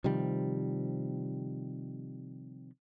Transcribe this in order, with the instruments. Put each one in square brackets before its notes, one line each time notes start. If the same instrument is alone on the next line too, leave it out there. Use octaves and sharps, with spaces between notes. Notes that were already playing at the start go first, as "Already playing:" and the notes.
[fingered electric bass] C3 D#3 F3 G3